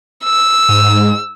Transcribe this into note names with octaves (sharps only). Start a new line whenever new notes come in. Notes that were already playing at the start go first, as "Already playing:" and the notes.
E6
G#2